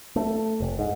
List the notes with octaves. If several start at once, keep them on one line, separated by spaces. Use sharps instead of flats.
A3
F1
G#2